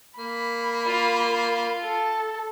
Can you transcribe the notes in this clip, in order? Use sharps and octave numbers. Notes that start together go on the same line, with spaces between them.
A#3 B5
F4
A4